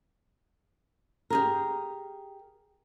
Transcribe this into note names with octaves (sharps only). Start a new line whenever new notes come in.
G4 G#4 A#4